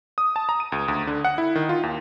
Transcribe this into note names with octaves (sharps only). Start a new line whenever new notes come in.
D#6
A5
A#5
D#7
C#2
D2
D3
F#5
E4
D#3
F4
D#2